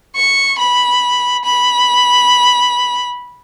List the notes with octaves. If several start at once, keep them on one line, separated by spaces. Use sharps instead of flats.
C#6
B5
B5